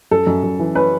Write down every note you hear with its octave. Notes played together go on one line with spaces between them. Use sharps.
F#2 A4
F#2
F#2
E3
C#4 B4